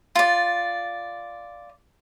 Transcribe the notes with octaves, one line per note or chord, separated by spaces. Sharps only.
F4 D5